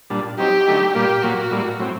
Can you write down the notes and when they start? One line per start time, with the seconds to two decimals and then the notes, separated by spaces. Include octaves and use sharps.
0.10 A#2 G3 D4
0.38 F#3 C4 D#4 G4
0.67 D3 F#3 A3 D#4
0.95 A#2 G3 A#3 G4
1.23 A#2 F#3 A#3 F#4
1.51 A2 G3 A#3
1.79 A2 F#3 C4